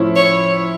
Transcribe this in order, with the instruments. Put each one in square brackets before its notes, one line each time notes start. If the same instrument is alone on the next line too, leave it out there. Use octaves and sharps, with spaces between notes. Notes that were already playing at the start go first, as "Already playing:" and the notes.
Already playing: [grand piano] A2 F3 C#4 E4
[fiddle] C#5